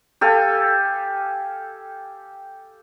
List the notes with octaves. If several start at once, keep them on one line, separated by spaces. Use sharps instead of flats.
G4 A4 F5 G#5